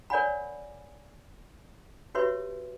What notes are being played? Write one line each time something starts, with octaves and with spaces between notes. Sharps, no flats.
A#4 C#5 D5 F#5 G#5 B5
F#4 G4 B4 C#5 E5 C6